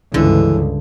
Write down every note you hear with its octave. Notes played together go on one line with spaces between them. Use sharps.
C#2 G2 D3 E3